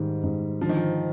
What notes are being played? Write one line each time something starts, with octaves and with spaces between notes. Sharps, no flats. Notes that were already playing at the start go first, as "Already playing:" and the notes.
Already playing: G#2 D#3 G3
G#2
D3 F3
D#3
F3